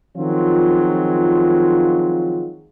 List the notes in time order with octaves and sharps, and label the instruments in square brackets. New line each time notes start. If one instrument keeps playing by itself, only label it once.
[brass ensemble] D#3 F3 F#3 G#3 C4 F4